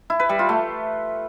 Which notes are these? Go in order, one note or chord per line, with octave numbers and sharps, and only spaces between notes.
E4
B4
G3
F4
A3